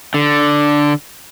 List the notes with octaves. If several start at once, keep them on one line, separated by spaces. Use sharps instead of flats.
D3